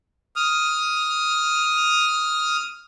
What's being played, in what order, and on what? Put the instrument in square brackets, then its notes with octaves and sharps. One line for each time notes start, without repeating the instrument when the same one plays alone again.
[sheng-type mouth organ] D#6 F6